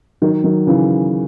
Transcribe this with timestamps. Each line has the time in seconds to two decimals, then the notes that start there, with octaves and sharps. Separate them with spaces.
0.22 D#3 F#3
0.44 D#3 F#3
0.67 C#3 E3